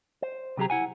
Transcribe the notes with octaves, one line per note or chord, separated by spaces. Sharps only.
C5
C3 F#3 G4 G#4 A#5
E4 F#5 G#5